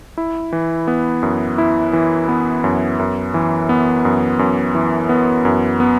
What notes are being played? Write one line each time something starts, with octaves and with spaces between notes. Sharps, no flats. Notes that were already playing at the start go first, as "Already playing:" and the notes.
E4
E3
B3
F#2
E4
E3
B3
F#2
F#2
E3
B3
F#2
F#2
E3
B3
F#2
B3